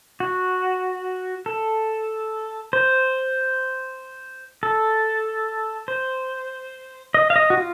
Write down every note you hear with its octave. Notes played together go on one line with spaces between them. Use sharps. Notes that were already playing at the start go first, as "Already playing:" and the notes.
F#4
A4
C5
A4
C5
D#5
F5
D#5
F#4
F4